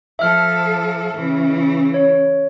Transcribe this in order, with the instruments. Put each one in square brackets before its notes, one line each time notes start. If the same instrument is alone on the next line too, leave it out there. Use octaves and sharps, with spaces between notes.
[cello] F3 A4 [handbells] E5 F6
[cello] C#3 E3
[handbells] C#5